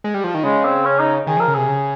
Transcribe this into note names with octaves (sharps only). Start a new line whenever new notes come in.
G#3
G3
F3
D#3
C#3 G#3
C4
C#4
D#4
D#3 G#4
F3 A#4
C#3
C3 G#4
C#3